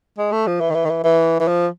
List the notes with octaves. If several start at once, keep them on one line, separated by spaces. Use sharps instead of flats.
G#3
A3
F3
E3
D#3
E3
D#3
E3
E3
E3
F3